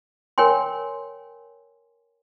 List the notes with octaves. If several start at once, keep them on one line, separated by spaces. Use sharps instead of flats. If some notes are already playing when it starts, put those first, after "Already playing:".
A#4 C#5 G5 G#5 C6